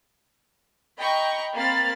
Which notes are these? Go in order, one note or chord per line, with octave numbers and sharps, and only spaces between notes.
D#5 G5 A#5 B5 C#6
A#3 C4 F5 B5 A6